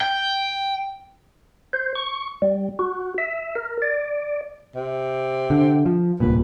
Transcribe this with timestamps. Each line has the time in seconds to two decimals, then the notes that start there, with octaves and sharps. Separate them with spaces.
0.01 G5
1.73 C5
1.95 C#6
2.42 G3
2.79 F#4
3.18 E5
3.56 A#4
3.82 D5
4.75 C3
5.50 D3
5.86 F3
6.20 D1 C2 A#2 B4